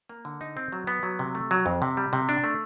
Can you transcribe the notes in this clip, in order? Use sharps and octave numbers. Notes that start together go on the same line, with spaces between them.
A#3
D3
D#4
C4
F#3
B3
F#3
C3
A3
F#3
F2
C3
G3
C3
D4
A3